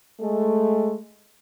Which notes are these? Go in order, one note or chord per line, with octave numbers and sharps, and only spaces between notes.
G#3 A3